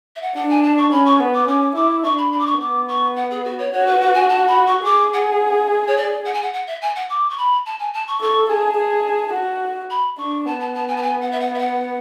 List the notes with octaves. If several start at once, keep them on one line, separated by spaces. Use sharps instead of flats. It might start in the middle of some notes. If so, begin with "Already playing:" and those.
E5
F#5
D4 F#5
G#5
A5
C#6
C#4 B5
C#6
B3
D6
C#4 D6
E4 D6
D4 C#6
B5
B5
D6
C#6
B3 D6
C#6
F#5
G#4
F#4
C#5
F#4 C#5
B4
B4
G#5
A5
B5
C#6
G#4 D6
F#5
C#5
D5
F#5
G#5
F#5
F#5
E5
G#5
F#5
D6
C#6
B5
A5
G#5
A5
C#6
A4 C#6
G#4 A5
G#4
F#4
B5
D4 C#6
B3 A5
A5
A5
G#5
A5
G#5
F#5
E5
F#5
E5
F#5